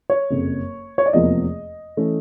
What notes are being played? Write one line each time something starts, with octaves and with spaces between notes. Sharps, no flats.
C#5
F#1 F2 C#3
C#5
D5
F1 E2 C3 F3 A#3 D#5
E3 A3 C#4